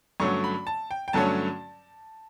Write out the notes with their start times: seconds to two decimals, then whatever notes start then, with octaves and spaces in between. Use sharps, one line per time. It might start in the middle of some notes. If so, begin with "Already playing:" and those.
0.20 G2 D3 F#3 A3 C#4 C#6
0.44 B5
0.67 A5
0.91 G5
1.08 G5
1.13 G2 D3 F#3 A3 C#4 A5